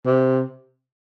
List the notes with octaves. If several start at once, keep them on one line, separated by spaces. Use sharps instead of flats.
C3